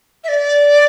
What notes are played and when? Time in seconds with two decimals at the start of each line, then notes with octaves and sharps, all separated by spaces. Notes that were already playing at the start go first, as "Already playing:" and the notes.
0.24 E5
0.28 D5